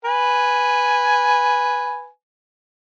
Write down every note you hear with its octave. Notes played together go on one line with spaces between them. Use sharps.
B4 G#5